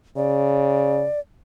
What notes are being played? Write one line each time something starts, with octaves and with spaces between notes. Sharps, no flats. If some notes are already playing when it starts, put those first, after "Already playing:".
C#3 D5